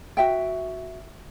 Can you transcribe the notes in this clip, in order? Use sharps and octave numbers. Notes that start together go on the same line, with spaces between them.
F#4 E5 G5